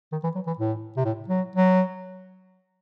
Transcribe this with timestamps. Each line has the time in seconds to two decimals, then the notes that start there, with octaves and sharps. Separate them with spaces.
0.12 D#3
0.24 E3
0.36 F#3
0.47 E3
0.58 A2
0.97 C3
1.05 A2
1.28 F#3
1.56 F#3